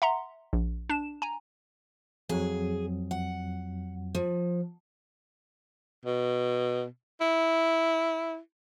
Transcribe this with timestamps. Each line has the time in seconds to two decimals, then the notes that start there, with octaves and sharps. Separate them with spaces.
0.02 E5 F#5 A#5 C6
0.53 A#1
0.89 D4 E7
1.22 G#5 A#5
2.29 F2 F#3 G#4
3.11 F#5
4.15 F3
6.06 B2
7.21 E4